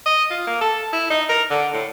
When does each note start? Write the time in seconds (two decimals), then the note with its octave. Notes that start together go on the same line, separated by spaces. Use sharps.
0.06 D#5
0.30 F4
0.47 A#3
0.61 A4
0.93 E4
1.10 D#4
1.29 A#4
1.50 D3
1.73 A2